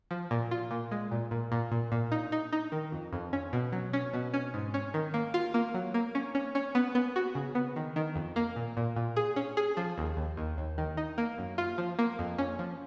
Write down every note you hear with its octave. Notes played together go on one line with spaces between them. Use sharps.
F3
A#2
F4
A#2
G#3
A#2
A#2
A#2
A#2
A#2
D#4
D#4
D#4
D#3
F2
F2
C#4
B2
F#3
C#4
B2
C#4
G#2
C#4
D#3
A#3
F4
A#3
F#3
A#3
C#4
C#4
C#4
B3
B3
F#4
C#3
B3
D#3
D#3
F2
A#3
A#2
A#2
A#2
G#4
C#4
G#4
F3
D#2
D#2
D#2
D#2
D#3
D#4
A#3
F#2
F4
F3
A#3
F2
C#4
F3